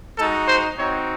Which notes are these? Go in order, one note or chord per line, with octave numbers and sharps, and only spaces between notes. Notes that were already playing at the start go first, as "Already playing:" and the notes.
G#3 D#4 F#4 A4
C5
C4 D#4 F#4 C#5